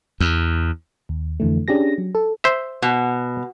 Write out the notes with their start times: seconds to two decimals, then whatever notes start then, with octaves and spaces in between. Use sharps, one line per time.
0.20 E2
1.09 D#2
1.40 F2 D3 E3 A3
1.68 C#4 D4 G4 G#4 A#6
1.98 F#3
2.15 A4
2.44 C5 E5
2.82 B2